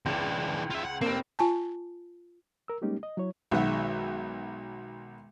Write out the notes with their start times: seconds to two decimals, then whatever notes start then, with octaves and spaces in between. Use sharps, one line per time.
0.06 C#2 E3 D4
0.71 F4 E5
0.85 F#5
1.01 F1 A#3 C4
1.39 F4 G#5 A5
2.68 A#4 E6
2.82 G3 G#3 A#3 C#4 D#4 G4
3.03 D#5
3.17 F#3 E4 C#5
3.51 B1 D#3 G#3 F#4 E5 F#5